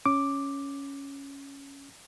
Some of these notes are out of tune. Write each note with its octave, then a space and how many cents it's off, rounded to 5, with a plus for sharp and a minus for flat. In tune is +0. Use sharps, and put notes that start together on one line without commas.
C#4 +0 D6 +0